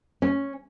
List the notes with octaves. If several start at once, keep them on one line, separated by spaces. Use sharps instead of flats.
C#4